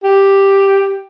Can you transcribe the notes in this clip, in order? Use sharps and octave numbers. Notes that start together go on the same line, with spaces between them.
G4